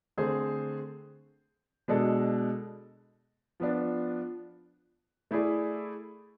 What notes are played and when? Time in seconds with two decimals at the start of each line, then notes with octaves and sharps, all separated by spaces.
0.17 D3 A3 C4 G#4 C5
1.88 B2 G#3 D4 A4
3.60 F3 B3 D4
5.31 A3 E4 G#4 D5